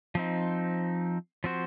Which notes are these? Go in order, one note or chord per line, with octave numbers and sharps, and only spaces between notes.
F3 C4 D#4
F3 C4 F#4 C5